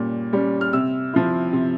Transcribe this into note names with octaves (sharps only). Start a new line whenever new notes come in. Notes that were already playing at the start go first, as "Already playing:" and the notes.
Already playing: A#2 G3 C#4
G3 C#4
F6
C3 E6
F3 C4 E4
C3